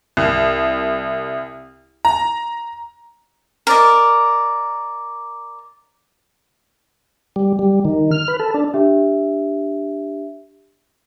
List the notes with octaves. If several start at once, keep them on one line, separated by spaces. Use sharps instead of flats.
C2
A#5
A#4 D5 D#5
G3
G3
D#3
F6
B4
A4
D4
D4 G4 E5